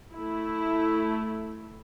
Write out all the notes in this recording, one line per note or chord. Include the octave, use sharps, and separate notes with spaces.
A3 E4